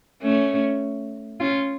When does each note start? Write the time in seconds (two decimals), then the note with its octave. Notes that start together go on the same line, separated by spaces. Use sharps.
0.22 A3 C#4
1.40 C#4 F4